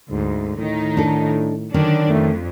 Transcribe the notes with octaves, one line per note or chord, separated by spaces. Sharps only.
D2 G#2
A2 D#3 D#4
D4 A4
D3 D#3 F#3 C#4 D4
F2 A3